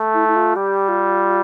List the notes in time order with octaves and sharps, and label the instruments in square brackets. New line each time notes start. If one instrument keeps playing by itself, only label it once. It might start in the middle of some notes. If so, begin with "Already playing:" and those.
Already playing: [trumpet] A3
[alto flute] E4
E4
F4
[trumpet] G3 [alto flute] G4
[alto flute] F4